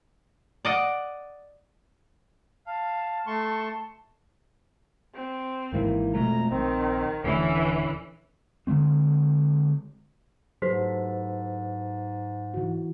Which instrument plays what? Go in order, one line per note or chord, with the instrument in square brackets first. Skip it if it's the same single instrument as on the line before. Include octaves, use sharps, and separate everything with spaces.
[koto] D5 D#5 F#5
[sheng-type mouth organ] F5 [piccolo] A5
[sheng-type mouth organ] A3 C6 C#6
[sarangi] C4
[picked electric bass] G#1 G#2 E3 [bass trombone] A#3
[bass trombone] F2 [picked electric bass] B2 G#3 A3 [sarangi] A#5
[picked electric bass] A#1 [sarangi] D#3 [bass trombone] C4
[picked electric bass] D#1 [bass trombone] D3 [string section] E3 [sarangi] C#4
[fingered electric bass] D3 F3 G#3 C4
[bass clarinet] G#2 [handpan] F#3 A4 B4 [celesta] G4 C5 B6
[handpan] E3 F#4